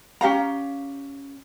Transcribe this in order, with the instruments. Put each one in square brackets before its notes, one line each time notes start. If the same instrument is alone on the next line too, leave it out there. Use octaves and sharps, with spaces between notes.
[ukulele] C#4 G4 F5 A#5